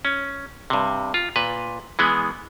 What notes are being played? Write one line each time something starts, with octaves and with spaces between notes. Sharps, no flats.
C#4
G2 C3
F4
A#2 B4
E3 G#3 B3